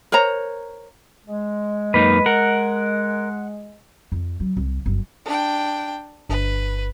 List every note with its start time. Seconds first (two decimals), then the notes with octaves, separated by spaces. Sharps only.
0.12 A#4 C5 C#5 A#5
1.27 G#3
1.94 F#2 A#3 D#4 B4
2.26 A#4 F#5
4.12 F2
4.40 F#3
4.57 C2
4.86 G1 F#2
5.25 D4 G5
6.30 G1 B4